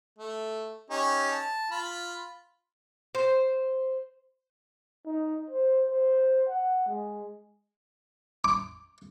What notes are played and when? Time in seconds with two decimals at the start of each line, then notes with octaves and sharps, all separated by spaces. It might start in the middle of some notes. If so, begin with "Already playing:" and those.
0.18 A3
0.90 C#4 D#4 G4
1.32 A5
1.71 F4 B5
3.15 C5
5.06 D#4
5.50 C5
5.91 C5
6.48 F#5
6.88 G#3
8.44 D6